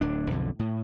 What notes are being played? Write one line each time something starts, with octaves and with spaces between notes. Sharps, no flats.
D1 D4
B1 F2 D3
A2